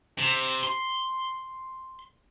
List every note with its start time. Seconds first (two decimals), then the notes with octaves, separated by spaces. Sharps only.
0.18 C3
0.63 C6